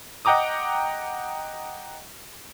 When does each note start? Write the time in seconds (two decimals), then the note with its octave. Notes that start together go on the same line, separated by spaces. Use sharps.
0.25 D#5 F#5 G5 A#5 D6 D#6